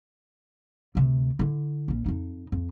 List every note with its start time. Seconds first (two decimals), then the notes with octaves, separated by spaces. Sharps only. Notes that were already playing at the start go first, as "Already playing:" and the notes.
0.95 D2 C3
1.39 D3 E4
1.88 A#1 C#4
2.06 F2 D#4
2.52 F2